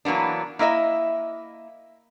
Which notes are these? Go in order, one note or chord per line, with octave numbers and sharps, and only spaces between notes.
E3 F#3 A#3 B3 D4
A#3 E4 D#5 E5